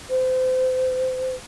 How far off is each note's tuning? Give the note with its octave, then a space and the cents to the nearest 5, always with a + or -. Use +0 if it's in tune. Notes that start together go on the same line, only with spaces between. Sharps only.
C5 -30